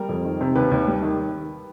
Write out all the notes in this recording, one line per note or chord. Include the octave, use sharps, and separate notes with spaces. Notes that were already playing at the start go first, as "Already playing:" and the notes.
Already playing: G3 A#4
F2
D#3
C3
D#2 B4
D#2
G3
D#3